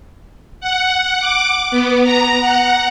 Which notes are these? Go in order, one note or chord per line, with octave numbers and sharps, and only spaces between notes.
F#5
D6
B3
A#5
F#5